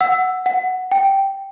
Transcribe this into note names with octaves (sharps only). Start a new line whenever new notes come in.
F#5 E6
F#5
G5